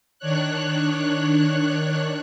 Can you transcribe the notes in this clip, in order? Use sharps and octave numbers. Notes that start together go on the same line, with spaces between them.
D#3 D4 C#5 F#6